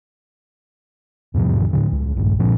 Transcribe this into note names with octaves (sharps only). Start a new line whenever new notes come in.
E2 G#2 C3 F3
D2 A2 D3
C#2
A#1 G2
A#2 F3 C4